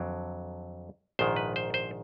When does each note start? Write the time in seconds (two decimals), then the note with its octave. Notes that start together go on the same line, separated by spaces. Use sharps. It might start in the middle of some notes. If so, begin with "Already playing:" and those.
Already playing: F2 D3 F#3
1.19 A#1 G#2 D#3 C5
1.36 B4
1.56 C5
1.74 C5